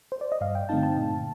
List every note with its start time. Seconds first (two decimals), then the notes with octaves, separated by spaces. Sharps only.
0.12 C5
0.21 D5
0.32 D#5
0.41 G2 F5
0.55 G5
0.69 D3 A3 C4 D#4 A5
0.83 A5
0.97 A#2